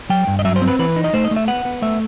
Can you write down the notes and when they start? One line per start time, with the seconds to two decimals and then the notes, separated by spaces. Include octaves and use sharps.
0.10 F#3 G5
0.27 G2
0.39 D#5
0.45 F#3 E5
0.56 C5
0.62 C4
0.68 B4
0.79 E3 B4
0.96 D#4
1.04 D#5
1.13 A3 C5
1.25 D#5
1.31 A3
1.36 E5
1.48 B3 F#5
1.65 B3
1.82 A3 E5